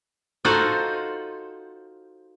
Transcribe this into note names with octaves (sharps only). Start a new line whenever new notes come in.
D#4 F4 F#4 A4 C5 F5